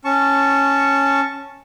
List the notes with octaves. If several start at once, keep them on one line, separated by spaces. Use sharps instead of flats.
C#4 A5 C#6